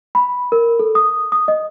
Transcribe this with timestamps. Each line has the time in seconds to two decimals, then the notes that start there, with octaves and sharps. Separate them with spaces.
0.15 B5
0.52 A#4
0.80 A4
0.95 D#6
1.32 D#6
1.48 D#5